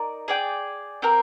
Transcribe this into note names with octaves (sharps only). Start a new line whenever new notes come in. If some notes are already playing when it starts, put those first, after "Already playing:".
Already playing: D#4 A#4 D5
G#4 D5 G5
C4 G4 A#4